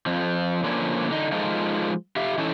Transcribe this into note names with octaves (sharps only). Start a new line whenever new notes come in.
F2 F3
D3 F3 A#3 C#4 D4
D3 D#4
F3 G#3 D#4 F4 A4 A#4
G4 E5 F5
E3 C#4 D#4 E4 A4 A5